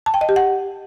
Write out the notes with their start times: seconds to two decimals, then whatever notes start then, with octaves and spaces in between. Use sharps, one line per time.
0.06 A5
0.14 G5
0.21 D#5
0.29 G4
0.36 F#5